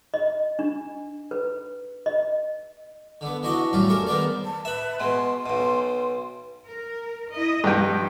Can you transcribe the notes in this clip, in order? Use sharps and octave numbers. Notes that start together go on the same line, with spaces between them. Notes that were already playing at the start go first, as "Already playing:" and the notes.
D#5
D4
B4
D#5
D3 B3
E3 D4 F#4 D#5 F#5
F2 A2 F#3 G3 F4
C#4 D4 A4 A#4
D#3 G#3 B3 A#4 C5 D5
A5
B4 E5 B5
B2 G#3 C6
B1 B2
A#4
E4 D#5
G2 F3 G#3 D#4 G5